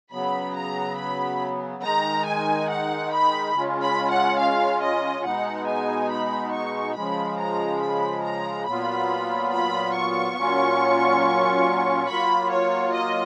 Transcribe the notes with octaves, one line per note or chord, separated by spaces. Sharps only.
C#3 F#3 B3 B5
A#5
B5
D#3 G#3 D#4 A#5
G#5
F#5
B5
C#3 G#3 C#4 F4
B5
F#5
F5
D#5
B2 G#3 B3 D#4 F#5
G#5
B5
C#6
C#3 F3 G#3 B5
A#5
B5
A#5
A#2 F#3 B3 F4 B5
B5
C#6
A#2 F#3 C#4 F4
F#3 A#3 F4 B5
C#5
D#5